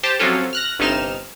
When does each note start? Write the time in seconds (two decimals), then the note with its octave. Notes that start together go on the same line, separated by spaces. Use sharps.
0.03 G4 C5 A5
0.19 C3 F3 F#3 C#4 F4 A4
0.53 F6 F#6 A#6
0.79 G1 G2 C3 D#4 F6 E7